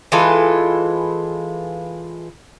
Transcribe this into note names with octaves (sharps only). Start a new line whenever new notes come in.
E3 G#3 F4 A4